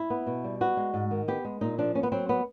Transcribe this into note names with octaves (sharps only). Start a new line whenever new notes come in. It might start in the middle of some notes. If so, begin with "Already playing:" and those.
Already playing: E4
B3
B2
G3
B3 F#4
G#3
G#2
D#3
B3 G4
G#3
A#2 D#4
F3 D4
A#3 C#4
B3
F#3 C4
B3